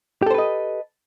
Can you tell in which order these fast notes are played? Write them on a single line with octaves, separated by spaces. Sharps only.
G4 A4 C5 B4 D#5